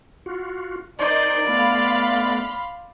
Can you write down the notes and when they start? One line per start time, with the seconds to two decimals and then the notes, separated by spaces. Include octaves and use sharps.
0.26 F4 F#4
0.99 D#4 A#4 C5 D5 C6
1.47 A3 B3 F5 B5 C6